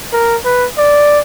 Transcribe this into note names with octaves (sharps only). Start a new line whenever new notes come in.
A#4
B4
D5